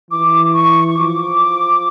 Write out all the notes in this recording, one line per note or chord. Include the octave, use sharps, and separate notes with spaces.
E3 D6
C#6
C#6
F3 D6